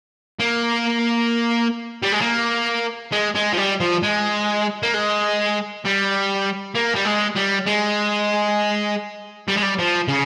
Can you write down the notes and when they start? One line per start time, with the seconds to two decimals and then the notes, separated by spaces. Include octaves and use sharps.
0.40 A#3
2.02 G3
2.12 G#3
2.21 A#3
3.12 G#3
3.35 G#3
3.53 F3
3.57 G3
3.80 F3
4.03 G#3
4.83 A#3
4.94 G#3
5.85 G3
6.75 A#3
6.96 G3
7.06 G#3
7.36 G3
7.67 G#3
9.48 G3
9.55 G#3
9.62 G3
9.79 F3
10.08 C#3